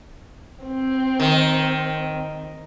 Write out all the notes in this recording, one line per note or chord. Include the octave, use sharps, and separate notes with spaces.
C4
D#3